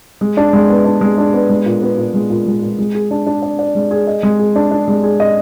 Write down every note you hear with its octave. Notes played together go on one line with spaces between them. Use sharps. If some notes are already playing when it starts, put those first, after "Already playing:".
G#3
D4
G#3
B3
D4
G#3
D4
B3
G#3
A#2
B3
A#2
G#3
A#2
G#3
A#2
G#3
G#4
D4
D4
D5
D5
G#3
G#4
D#5
G#3
G#4
D4
D4
G#3
G#4
D#5